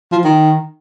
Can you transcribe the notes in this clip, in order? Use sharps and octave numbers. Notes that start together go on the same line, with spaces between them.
F3
D#3